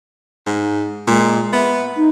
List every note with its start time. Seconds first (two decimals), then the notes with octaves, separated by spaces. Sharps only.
0.46 G#2
1.07 A#2 G#3
1.53 B3 E5
1.97 D#4